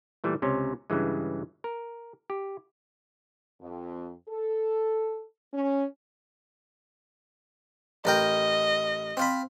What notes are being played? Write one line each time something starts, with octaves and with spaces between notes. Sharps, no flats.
A#2 E3 G3 A3
C#2 C3 C#4
G2 C#3 E3 G#3
A#4
G4
F2
A4
C#4
A1 A#4 D#5 G5
C4 F4 B5